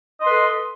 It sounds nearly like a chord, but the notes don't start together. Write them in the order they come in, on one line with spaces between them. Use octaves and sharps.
D#5 C6 B4 A4